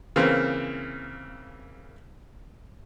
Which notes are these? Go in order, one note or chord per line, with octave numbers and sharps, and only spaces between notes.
C#3 E3 A#3 C4